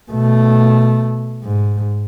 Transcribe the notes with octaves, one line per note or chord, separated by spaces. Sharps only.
B2 A3
G#2